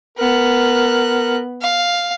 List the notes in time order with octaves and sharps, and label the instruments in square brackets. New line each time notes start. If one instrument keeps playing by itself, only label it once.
[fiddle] B3 F#6 [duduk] A#4
[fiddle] F5